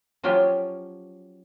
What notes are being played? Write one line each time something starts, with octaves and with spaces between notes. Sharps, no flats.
F3 F#3 C#4 F4 G4